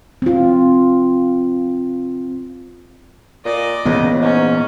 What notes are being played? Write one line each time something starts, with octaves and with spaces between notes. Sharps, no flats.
C4 F4
A#2 D5 D#5
C#2 A#2 E3 B3
G#2 C#4